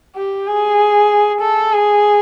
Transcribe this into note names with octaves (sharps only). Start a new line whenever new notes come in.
G4
G#4
A4
G#4